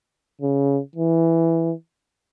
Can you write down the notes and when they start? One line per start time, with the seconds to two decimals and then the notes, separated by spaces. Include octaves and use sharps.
0.41 C#3
0.95 E3